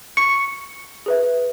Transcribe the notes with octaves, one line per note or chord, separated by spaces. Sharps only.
C#6 C#7
G#4 B4 E5